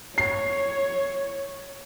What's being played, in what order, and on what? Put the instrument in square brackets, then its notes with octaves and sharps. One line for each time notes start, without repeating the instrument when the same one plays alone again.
[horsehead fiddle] C#5 [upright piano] C7